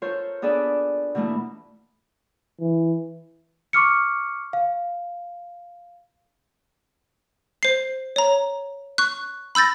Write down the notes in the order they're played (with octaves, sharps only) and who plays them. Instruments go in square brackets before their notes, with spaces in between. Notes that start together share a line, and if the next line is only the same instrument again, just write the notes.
[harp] F4 A4 A#4 C5 C#5
B3 D4 G#4 A4 B4 D5
B2 E3 A3 A#3 E4
[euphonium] E3
[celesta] C#6 D6 F6 C#7
F5
[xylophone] C5 C7
C#5 A#5
C#6 F#6
B5 E6 G6 A6 A#6